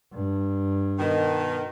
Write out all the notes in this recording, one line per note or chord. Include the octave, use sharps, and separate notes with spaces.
G2
B2 D#3